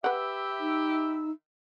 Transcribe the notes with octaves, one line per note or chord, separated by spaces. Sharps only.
G4 B4 E5 F#5 B5 E6
D#4